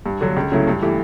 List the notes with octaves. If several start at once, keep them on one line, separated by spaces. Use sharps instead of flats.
G2
D3 F#3
C#2
C#3 F#3 A3 E4
G2
E3 A3 E4 G4